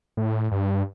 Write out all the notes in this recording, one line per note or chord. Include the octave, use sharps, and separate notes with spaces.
A2
G2